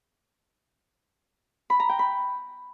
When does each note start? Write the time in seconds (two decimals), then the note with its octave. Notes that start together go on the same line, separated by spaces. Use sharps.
1.70 B5
1.80 A#5
1.89 G5
1.99 B5